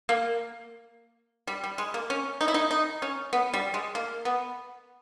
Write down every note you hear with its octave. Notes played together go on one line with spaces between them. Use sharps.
A#3
G3
G3
G#3
A#3
C#4
D#4
E4
D#4
D#4
C#4
B3
G3
G#3
A#3
B3